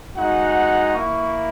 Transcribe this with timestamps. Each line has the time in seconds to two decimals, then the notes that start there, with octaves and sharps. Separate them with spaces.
0.15 G#3 D#4 F#4 F#5
0.92 A#3 E4 C#6